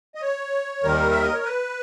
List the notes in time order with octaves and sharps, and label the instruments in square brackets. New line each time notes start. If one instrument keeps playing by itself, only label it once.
[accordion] D#5
C#5
D#2 D#3 G3 A#4
E5
D#5
C#5
B4